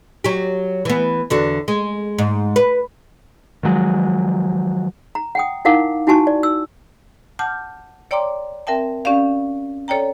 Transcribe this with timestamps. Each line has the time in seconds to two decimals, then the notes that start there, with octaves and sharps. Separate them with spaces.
0.24 F#3 G4
0.85 E3 B3
1.30 E2 D3 F#4
1.68 G#3
2.18 G#2
2.56 B4
3.63 D#3 F3 F#3 G#3
5.15 A#5
5.35 F#5 G5 D#6
5.65 D#4 E4 A#4 F5 F#5 D6
6.07 D#4 E4 F#4 G#5 A5 C#6
6.27 D5
6.43 E6
7.39 F#5 A5 D6 F6 G6
8.11 C#5 D5 G5 A#5 C6 D6
8.67 C4 A#4 E5 G5 A5
9.05 C#4 G4 D5 F5
9.88 A4 C#5 D5 G5 A#5